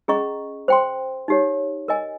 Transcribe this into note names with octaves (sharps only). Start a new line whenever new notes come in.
C#4 G#4 D#5 A#5 C#6
C5 G5 C6
D#4 G4 C#5
A#4 D#5 G#5